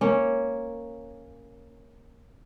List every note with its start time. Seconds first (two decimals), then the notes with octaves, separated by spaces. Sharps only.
0.01 A#3 C#4